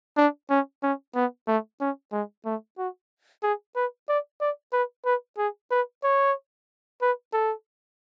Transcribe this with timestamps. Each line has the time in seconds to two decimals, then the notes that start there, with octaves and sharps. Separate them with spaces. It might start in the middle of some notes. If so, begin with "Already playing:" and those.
0.17 D4
0.50 C#4
0.83 C#4
1.15 B3
1.47 A3
1.80 C#4
2.13 G#3
2.45 A3
2.78 F#4
3.43 G#4
3.76 B4
4.09 D5
4.41 D5
4.73 B4
5.05 B4
5.38 G#4
5.71 B4
6.04 C#5
7.02 B4
7.33 A4